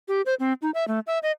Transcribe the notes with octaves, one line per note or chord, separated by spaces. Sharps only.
G4
C5
C4
D#4
E5
A3
E5
D#5